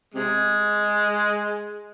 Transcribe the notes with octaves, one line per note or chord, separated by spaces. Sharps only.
C3 G#3